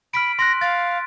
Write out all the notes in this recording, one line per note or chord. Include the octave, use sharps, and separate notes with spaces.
B5 F6 B6 D7
C6 F#6 A#6
F5 A6